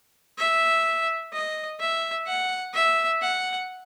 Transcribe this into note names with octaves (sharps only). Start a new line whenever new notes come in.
E5
D#5
E5
F#5
E5
F#5